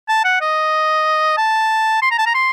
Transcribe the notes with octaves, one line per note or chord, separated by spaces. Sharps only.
A5
F#5
D#5
A5
C6
A#5
A5
A#5
C6